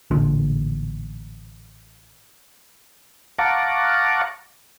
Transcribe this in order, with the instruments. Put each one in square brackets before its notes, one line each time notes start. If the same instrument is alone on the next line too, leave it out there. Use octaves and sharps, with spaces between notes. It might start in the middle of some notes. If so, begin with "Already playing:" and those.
[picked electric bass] A1 A#2 D3 F3
[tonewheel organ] F5 F#5 A5 A#5 C#6 D6